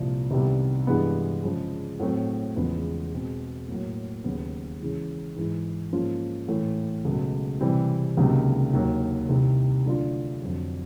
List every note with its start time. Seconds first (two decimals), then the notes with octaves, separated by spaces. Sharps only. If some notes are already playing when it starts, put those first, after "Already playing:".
Already playing: C2 A#2 F3
0.31 C2 C3 D#3 G3 B3
0.87 G2 E3 G#3 B3
1.43 C#3 F3 G#3
2.00 A2 F#3 A3 C4
2.56 E2 C#3 F3 G#3 B3
3.12 B2 G#3 C4
3.68 A2 F#3 A#3
4.24 D#2 C#3 F#3 B3
4.80 C#3 E3 G#3
5.36 G#2 E3 G#3
5.92 G#2 F3 A#3 C#4 F4
6.48 A2 E3 A3
7.05 C#2 B2 F#3 A3
7.61 C3 E3 G3 C4
8.17 C#2 C3 D#3 F#3 A#3
8.73 D#2 D#3 F#3 A#3
9.29 C2 C3 D#3
9.85 D3 F#3 A3 D4 F4
10.42 F2 D3 F#3